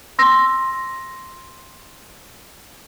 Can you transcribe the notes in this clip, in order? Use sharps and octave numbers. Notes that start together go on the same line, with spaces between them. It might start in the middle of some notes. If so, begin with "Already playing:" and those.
C6 E6 A#6